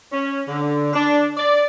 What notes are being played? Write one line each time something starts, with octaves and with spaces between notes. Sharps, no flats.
C#4
D3
D4
D5